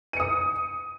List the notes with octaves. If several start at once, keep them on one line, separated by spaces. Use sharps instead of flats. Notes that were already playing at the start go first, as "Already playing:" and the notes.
D#6 C#7 D#7